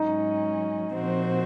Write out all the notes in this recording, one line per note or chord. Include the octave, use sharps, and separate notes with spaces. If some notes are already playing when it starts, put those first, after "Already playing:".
Already playing: G#2 F#3 C#4 D#4
A#2 F3 C4 F#4 C5